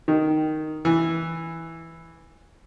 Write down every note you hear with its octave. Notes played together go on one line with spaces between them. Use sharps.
D#3
E3